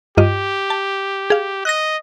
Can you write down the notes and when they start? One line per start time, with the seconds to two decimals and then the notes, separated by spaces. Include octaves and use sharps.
0.17 G2 F4 G4 D#5
0.70 A5
1.30 G#4 F5
1.65 D#5 F#6 A#6